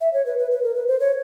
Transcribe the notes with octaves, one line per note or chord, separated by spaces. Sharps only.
E5
C#5
B4
B4
B4
A#4
B4
C5
C#5